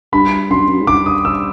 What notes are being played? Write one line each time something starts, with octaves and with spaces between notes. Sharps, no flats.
G2 B5
F#2 C6
G2
F#2
G#2
G2 D6
D#6
E6